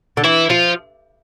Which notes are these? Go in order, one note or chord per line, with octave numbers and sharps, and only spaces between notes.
D3
E3 E4
F3 F4